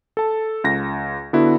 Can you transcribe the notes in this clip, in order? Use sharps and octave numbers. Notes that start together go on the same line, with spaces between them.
A4 A5
C#2 A#6
D3 B3 E4 F#4